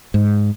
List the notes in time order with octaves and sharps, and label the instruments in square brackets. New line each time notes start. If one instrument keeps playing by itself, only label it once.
[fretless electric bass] G#2